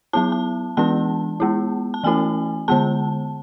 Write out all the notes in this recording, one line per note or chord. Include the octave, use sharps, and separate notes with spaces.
F#3 B3 E4 A5
A5
E3 G#3 B3 D4 A5
G#3 B3 E4
A5
E3 A3 C#4 E4 G#5
D3 G#3 B3 A5